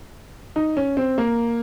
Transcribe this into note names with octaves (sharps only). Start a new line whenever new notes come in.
D#4
C#4
C4
A#3